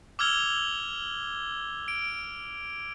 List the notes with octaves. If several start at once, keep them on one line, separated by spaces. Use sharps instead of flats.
D6 E6 F6 G#6 F7 G7
D7